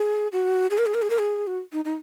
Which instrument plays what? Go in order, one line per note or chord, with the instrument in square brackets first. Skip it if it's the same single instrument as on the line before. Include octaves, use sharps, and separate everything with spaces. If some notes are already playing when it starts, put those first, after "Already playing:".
Already playing: [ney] G#4
F#4
G#4
A#4
G#4
A#4
G#4
A#4
G#4
F#4
D#4
D#4